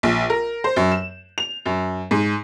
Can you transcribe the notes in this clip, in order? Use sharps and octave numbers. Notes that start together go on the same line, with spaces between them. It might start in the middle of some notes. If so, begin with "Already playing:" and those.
A#1
A#4
C5
F#2
E7
F7
F#2
G#2